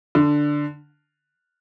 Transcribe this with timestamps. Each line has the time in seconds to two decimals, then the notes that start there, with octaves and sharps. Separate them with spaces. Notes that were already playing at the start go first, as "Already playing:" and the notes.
0.15 D3